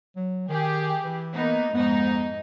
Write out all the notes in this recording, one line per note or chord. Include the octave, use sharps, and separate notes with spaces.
F#3
D#3 G4 G#4
E3
A#3 B3 D#4
F2 G#2 B3 D#4